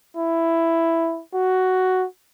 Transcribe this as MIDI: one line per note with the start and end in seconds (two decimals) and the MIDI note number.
0.17 1.21 64
1.34 2.06 66